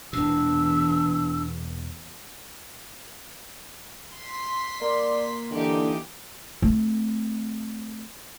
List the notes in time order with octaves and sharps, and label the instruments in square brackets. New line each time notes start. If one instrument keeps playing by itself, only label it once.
[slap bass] E1 A#2 [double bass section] E2 [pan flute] D4 [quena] E6
[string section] C6 B6
[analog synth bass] A#3 [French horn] D5
[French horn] D3 [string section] E3 D#4 G4
[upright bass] A3 C4